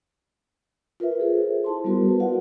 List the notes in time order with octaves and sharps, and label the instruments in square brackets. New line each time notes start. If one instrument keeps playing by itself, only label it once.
[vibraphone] F4 A#4 B4 E5
G#4 A4 C5
E4 A5 C6
G3 B3 F#4 A#4
A4 B4
F4 F#4 D5 F5 F#5